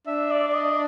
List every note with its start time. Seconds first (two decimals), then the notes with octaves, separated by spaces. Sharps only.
0.07 D4 E5
0.31 D5
0.48 D5
0.54 D#5